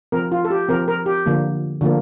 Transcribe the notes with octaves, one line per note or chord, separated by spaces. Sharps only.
F3 C4 A#4
F4
A4
G4
F3 C4 A#4
A#4
G4
D3 F3 A#3
D3 F3 A#3